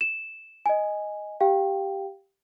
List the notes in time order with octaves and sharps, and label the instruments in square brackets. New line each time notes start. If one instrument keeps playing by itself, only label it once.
[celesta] E7
D#5 G#5
G4 F5 G5